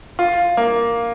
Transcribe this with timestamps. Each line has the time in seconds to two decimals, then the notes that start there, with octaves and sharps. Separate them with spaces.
0.19 F4
0.57 A#3